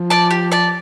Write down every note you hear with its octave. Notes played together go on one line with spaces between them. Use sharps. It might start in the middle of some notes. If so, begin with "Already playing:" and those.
Already playing: F3
D5 A5
G4
D5 A5